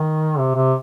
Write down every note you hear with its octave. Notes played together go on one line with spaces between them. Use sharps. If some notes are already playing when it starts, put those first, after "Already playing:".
Already playing: D#3
C3
C3